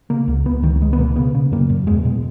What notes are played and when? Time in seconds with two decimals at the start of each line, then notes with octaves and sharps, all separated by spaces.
0.10 C#3 A#3
0.28 C#2
0.46 C#2 B3
0.63 C#2 D#3
0.81 C#2 G#3
0.93 B3
0.99 B2 A#3
1.16 C#3 B3
1.34 C#3
1.52 F#2 A#3
1.70 F#2
1.87 E2 G#3
2.05 B2